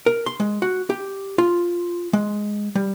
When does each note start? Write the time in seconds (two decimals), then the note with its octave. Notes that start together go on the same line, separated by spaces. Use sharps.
0.06 A#4
0.26 C6
0.40 G#3
0.62 F#4
0.90 G4
1.38 F4
2.13 G#3
2.75 G3